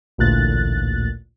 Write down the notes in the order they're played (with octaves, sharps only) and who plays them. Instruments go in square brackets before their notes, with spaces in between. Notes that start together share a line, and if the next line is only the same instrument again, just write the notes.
[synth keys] A1 D2 A#2 F#6 A6